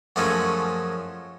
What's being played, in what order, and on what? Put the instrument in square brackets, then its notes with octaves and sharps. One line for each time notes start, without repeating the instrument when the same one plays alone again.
[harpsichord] F#2 F3 G#3 A3 C#4 D#4